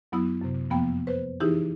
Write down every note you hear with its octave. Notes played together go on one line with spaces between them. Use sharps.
F#2 F#3 B3 E4 D#6
F#2 C3
F2 F3 A#3 B3 G5
B4 C5
E3 D#4 E4 G4 G#4